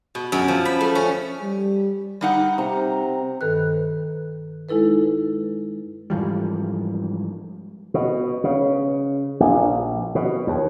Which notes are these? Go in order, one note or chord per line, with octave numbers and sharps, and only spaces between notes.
B2
F#2
F3
B5
A3
C#4
G3
G3 D#4 F#5
C3 A#5
G2 D#3 A4 B4 F#6
G#3 D#4 E4 A4 B4
G#2 E3 F3 G3
B2
C#3
A#1
B2
D#2